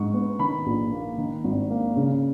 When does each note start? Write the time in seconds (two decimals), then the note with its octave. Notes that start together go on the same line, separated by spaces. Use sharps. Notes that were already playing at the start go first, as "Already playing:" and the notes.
Already playing: G#2 G#3 C#6
0.14 B3
0.39 D#3 B5
0.66 A#1
0.92 A#3
1.18 D#3
1.44 G#1
1.70 A#3
1.96 C#3